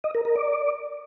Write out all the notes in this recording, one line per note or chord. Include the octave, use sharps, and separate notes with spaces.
D#5
A#4
A#4
D5